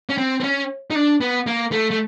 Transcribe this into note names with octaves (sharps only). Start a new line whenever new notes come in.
C#4
C4
C4
C#4
D#4
D4
B3
A#3
A3
A3